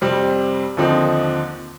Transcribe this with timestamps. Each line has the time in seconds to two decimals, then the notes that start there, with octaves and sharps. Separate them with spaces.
0.01 F2 C3 G3 C4
0.77 D#2 D3 F3 C4 D#4